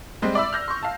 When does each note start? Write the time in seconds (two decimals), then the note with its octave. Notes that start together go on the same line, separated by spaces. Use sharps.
0.22 G3 G#3 C4
0.35 D5 E5 B5 E6
0.53 F6 G6 A#6
0.68 C6 C#6
0.83 F5 A5